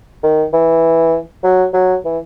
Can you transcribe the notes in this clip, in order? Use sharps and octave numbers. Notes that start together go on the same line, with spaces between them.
D#3
E3
F#3
F#3
E3